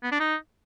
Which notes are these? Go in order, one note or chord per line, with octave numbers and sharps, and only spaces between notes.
B3
D4
D#4